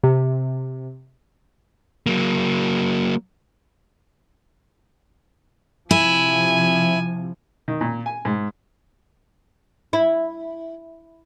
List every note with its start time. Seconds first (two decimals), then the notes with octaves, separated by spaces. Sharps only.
0.03 C3
2.06 F#3 A#3
5.91 C3 F3 E4 G#5
7.68 D#3
7.81 A#2
8.06 G#5
8.25 G#2
9.93 E4